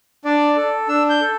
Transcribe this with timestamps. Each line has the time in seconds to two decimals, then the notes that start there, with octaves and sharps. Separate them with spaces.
0.25 D4 D5
0.56 A4
0.88 D4 E6
1.10 G6
1.21 A4